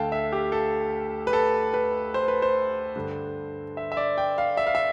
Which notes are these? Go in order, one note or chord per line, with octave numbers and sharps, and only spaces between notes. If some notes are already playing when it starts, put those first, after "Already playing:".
Already playing: D2 D3 F5 G5 A5
E5
G4
A4
B4
A4
B4
C5
B4
C5
G2 D3
E5
E5
D5
G5
F5
E5
F5
E5